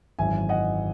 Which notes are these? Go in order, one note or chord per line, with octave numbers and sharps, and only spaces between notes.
G#1 F#2 E3 G#3 E5 G#5
D#5 F#5